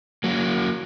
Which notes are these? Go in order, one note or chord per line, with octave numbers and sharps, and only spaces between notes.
F#3 A#3